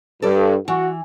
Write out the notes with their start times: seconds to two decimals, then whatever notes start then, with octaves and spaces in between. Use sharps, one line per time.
0.22 G2 A4 D5
0.68 E3 F#4